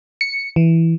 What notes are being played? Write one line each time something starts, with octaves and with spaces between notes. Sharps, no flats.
C#7
E3